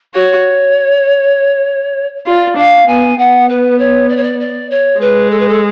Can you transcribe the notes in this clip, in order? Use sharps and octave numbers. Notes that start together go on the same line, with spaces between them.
F#4 C#5
F4 D5
D4 F5
B3 G#5
B3 F#5
B4
C#5
D5
C#5
D5
D5
C#5
G#3 B4
A4
B4
A4